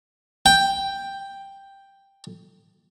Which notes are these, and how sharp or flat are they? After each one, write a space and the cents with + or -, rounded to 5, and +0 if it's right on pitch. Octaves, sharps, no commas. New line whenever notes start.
G5 +5